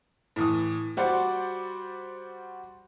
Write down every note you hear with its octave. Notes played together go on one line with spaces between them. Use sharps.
A2 E3 D#6
G3 F#4 C5 D5